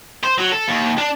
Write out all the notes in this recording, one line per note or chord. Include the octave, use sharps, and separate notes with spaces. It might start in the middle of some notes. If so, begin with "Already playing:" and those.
C5
F#3
A4
D#2
D4